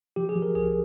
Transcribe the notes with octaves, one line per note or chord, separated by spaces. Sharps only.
F3 G4
G#4
F3
A#4
C2 G#4